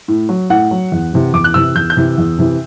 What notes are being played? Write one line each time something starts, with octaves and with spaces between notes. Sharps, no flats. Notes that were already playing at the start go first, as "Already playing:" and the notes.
A2
F#3
A2 F#5
F#3
E2
C3 E3
E2 D6
F#6
C3 E3 E6
E2 G6
G6
C3 E3
E2
C3 E3